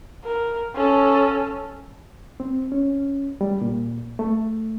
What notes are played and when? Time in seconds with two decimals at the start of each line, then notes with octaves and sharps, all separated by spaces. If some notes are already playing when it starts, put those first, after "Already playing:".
0.24 A#4
0.75 C#4 A4
2.40 C4
2.72 C#4
3.41 G3
3.61 A#2
4.19 A3